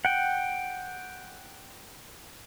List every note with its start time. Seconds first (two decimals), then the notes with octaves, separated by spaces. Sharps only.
0.05 F#5 G5